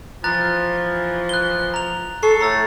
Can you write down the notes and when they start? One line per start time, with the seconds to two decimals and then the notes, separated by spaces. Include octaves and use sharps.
0.24 E3 F3 A#5 F#6 A6
1.29 F#6 G7
1.74 A#5 F7
2.23 A4 C#6 C7
2.41 A2 A#5 E6 A6